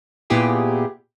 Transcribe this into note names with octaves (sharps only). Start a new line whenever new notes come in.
A#2 B3 E4 G4 G#4